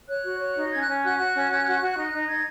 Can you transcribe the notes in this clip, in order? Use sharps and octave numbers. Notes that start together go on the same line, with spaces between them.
C#5 F#6
F#4
C#5
D#4
C#4 G#6
F#6
C#4
F#4 F#6
F#4
C#4
C#4
F#4
F#4
D#4
D#4
D#4 G#6